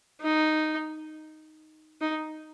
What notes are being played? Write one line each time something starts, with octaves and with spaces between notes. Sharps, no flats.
D#4
D#4